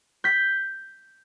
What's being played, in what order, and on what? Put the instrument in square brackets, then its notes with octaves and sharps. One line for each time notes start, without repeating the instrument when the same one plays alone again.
[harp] G6 B6